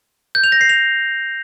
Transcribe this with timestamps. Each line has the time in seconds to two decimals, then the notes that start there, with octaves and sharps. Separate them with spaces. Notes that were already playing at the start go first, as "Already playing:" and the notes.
0.35 G6
0.44 F7
0.52 A#6
0.61 C7
0.69 F7